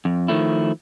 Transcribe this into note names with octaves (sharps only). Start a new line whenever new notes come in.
F2
D#3 F3 A3 E4